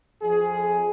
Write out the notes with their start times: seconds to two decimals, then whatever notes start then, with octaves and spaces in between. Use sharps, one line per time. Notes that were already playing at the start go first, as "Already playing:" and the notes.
0.21 F2 G#4